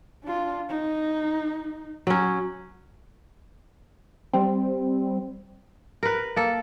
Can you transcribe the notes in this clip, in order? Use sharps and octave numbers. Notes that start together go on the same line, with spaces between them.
D4 F4
D#4
F#3 C#4
G3 C4
A#4 B4
A#3 A4